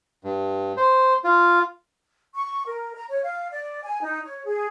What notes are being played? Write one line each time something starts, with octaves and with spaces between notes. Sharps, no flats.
G2
C5
F4
C#6
A#4
A#5
C#5
F5
D5
G#5
D#4
C#5
G#4